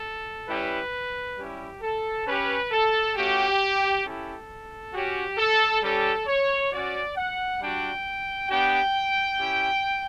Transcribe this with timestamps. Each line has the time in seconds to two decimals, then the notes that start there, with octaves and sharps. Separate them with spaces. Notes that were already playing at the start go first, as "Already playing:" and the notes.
Already playing: A4
0.48 G3 C#4 E4 G4 B4
1.37 G3 C#4 E4 G4
1.82 A4
2.27 C#4 G4 B4
2.72 A4
3.15 A3 C#4 F#4 G4
4.04 C#4 E4 G4 A4
4.93 C#4 F#4 G4
5.38 A4
5.83 G3 C#4 G4 A4
6.27 C#5
6.71 C#4 F#4 D5
7.16 F#5
7.60 G3 D4 F#4 G5
8.50 B3 D4 G4 G5
9.38 C#4 E4 G4